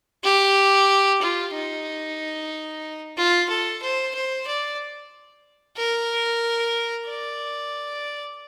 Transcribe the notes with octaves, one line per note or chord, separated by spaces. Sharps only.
G4
F4
D#4
F4
A4
C5
C5
D5
A#4
D5